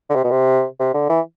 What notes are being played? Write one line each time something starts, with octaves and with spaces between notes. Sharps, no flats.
D3
C3
B2
C3
C3
D3
E3